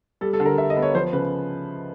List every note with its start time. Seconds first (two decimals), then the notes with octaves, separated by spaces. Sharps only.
0.21 G3 A4
0.33 A4
0.40 D3
0.46 A#4
0.58 D3 E5
0.70 D#5
0.76 B3
0.82 C#5
0.94 F3 C5
1.13 C#3 B4